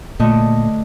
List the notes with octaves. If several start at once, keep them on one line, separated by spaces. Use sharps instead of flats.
A#2 D3 A3 D#5